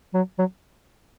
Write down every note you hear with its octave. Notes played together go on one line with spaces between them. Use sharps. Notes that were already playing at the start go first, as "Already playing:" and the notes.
F#3
F#3